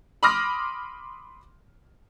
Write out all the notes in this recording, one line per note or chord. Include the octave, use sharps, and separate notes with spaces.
B5 C6 D6 D#6 F6 A#6